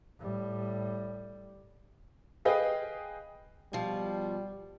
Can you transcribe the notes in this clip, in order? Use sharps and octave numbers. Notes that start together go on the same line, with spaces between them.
A2 G3
G#4 B4 D#5 F5 G5
B2 F3 G3